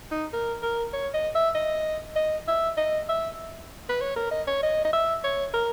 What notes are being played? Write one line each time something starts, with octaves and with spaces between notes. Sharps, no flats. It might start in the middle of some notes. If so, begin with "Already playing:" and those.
D#4
A#4
A#4
C#5
D#5
E5
D#5
D#5
E5
D#5
E5
B4
C#5
A#4
D#5
C#5
D#5
D#5
E5
C#5
A#4